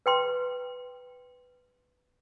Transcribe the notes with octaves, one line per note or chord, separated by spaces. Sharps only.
B4 G5 C6